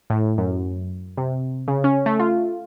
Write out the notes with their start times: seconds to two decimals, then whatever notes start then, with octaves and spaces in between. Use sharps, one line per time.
0.10 A2
0.38 F#2
1.17 C3
1.68 C#3
1.84 C#4
2.06 A3
2.19 F4